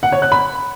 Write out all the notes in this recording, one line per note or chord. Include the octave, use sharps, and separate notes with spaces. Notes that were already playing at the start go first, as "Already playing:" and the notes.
F#5
C#5
F#6
B5